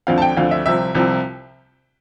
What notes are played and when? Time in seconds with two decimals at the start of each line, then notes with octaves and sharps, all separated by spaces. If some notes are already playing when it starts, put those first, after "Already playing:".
0.07 D2 D3 F3 C4 F5
0.18 A5
0.22 G5
0.37 D2 D3 F3 C4 F5
0.51 E5
0.66 C2 C3 F3 C4 E5
0.95 C2 C3 F3 C4